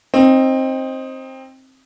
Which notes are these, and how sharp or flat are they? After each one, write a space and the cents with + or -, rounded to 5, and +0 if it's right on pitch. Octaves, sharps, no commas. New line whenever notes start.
C4 +15 D#4 +0